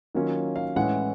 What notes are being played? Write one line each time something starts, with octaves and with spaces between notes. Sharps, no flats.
D#3 F#3 A#3 C#4 F4
F5
A2 E3 G#3 C#4 F#5